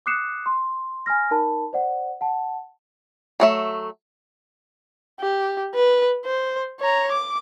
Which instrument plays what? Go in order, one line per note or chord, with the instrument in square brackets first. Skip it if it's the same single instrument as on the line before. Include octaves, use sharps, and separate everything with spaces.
[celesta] D6 D#6 F#6 C7 C#7 E7
C6
G#5 B5 F6 A#6
D#4 A#4 A5 B5
C5 D5 F#5
F#5 A5
[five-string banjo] F#3 A3 E5
[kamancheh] G4
B4
C5
C#5 A#5
D6